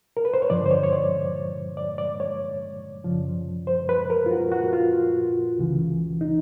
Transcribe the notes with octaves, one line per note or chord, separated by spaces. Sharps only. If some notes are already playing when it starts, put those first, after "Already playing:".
A#4
B4
C5
C#5
G2 D3 F3 D5
C5
C#5
C#5
D5
D5
D5
C#5
F#2 C#3 F3
C5
B4
A#4
F4
F#4
F#4
F4
C#2 C#3 E3
D#4